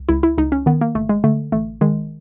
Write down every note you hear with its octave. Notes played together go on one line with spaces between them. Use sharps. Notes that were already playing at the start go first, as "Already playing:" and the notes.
Already playing: C2
C#2 E4
E4
C#2 D#4
C#4
D#3 B3
A#3
G1 A3
G#3
D3 A3
A1 A3
D#3 G#3